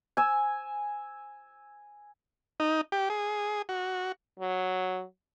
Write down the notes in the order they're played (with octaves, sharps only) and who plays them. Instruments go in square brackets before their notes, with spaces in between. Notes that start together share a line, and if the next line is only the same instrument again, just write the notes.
[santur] G#5 E6
[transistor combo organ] D#4
G4
G#4
F#4
[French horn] F#3